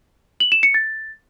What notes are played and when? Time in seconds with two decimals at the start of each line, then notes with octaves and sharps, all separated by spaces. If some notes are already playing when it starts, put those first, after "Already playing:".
0.40 F#7
0.52 E7
0.63 C#7
0.74 A6